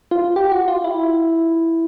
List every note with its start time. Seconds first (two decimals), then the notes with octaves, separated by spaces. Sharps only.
0.11 F4
0.36 G4
0.52 F#4
0.68 F4
0.84 E4